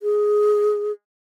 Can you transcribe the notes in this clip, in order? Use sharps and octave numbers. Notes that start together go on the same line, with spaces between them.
G#4